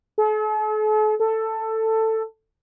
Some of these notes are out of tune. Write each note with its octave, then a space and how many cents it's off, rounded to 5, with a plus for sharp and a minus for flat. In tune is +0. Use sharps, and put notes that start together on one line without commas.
A4 -45
A4 +10